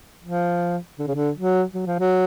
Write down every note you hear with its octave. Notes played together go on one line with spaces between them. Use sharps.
F3
D3
C#3
D3
F#3
F#3
F3
F#3